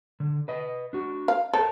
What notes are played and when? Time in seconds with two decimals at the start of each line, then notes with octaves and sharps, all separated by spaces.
0.20 D3
0.48 B4 D#5
0.93 D4 F#4
1.28 F5
1.53 A4 A#4 C5 C#5